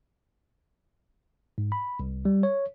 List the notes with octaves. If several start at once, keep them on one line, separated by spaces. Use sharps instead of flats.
G#2
B5
C2
G3
C#5